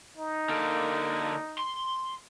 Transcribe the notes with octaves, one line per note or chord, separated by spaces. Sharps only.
D#4
D3 A#3
C6